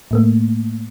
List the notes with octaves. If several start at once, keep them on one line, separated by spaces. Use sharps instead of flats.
A2 A3 A#3